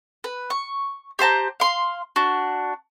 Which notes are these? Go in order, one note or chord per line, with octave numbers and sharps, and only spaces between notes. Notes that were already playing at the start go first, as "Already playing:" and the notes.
B4
C#6
G4 C5 A5 A#5
F5 C6
D4 F#4